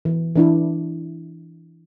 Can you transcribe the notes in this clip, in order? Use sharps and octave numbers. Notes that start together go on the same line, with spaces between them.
E3
E3 D4 E4